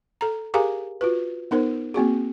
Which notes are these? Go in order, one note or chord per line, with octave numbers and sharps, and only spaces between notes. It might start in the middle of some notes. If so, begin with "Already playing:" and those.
A4 A#5
G4 G#4 A#4 F5 G#5 A#5
F4 F#4 B4
B3 D#4 A#4 C5
A#3 C4 F#4 G#4